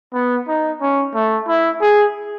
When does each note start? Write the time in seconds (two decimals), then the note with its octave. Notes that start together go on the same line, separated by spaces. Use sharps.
0.14 B3
0.48 D#4
0.81 C#4
1.14 A3
1.47 E4
1.81 G#4